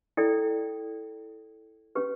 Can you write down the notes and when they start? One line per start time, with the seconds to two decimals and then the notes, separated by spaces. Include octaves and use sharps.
0.17 E4 A4 D5 G5
1.95 C#4 G4 B4